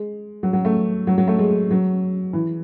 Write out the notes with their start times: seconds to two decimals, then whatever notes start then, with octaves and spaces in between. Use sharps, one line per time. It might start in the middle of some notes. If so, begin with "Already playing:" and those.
Already playing: G#3
0.43 F#3
0.53 F#3
0.65 A3
1.07 F#3
1.18 F#3
1.28 A3
1.39 G#3
1.71 F#3
2.33 E3